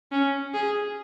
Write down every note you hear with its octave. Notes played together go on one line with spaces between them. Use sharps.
C#4
G#4